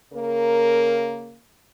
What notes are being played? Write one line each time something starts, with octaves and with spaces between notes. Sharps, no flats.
C#3 A#3 A#4